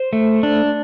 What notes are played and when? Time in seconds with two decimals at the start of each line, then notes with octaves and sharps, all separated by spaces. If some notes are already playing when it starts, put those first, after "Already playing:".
Already playing: C5
0.13 A3
0.43 D4